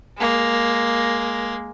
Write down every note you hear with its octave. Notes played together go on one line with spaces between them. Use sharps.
G#3 A#3